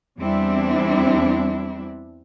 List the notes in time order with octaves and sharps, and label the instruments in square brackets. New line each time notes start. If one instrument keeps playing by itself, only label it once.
[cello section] E2 G3 C4 D4 E4